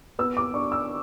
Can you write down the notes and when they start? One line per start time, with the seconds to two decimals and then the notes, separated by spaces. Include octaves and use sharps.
0.19 B3 E6
0.37 D6
0.54 D4 C#6
0.72 E6